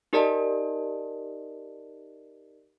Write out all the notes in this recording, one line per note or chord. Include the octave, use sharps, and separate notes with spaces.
D#4 G4 A#4 D5 D#5 A5